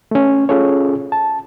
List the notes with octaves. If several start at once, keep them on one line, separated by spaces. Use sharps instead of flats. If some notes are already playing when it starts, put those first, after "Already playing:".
A3 C#4
C#4 F4 G#4 A4 C#5
A5